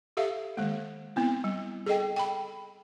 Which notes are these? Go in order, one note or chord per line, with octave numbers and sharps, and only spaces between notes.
G4 A4 E5 F5
D#3 G#3 A#3
B3 C4 E4
G3
G#4 A4 D#5 G5
G5 B5